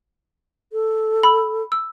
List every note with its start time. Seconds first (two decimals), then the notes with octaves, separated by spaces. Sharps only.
0.73 A4
1.23 B5 E6
1.72 E6